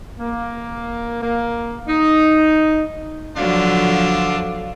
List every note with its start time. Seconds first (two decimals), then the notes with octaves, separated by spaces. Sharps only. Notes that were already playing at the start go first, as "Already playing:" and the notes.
0.19 A#3
1.22 A#3
1.88 D#4
3.37 D3 F3 F#3 D4 F4 F5